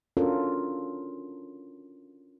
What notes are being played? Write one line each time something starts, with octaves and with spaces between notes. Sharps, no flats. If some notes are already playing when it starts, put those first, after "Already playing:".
C#4 D4 F4 F#4 A4 A#4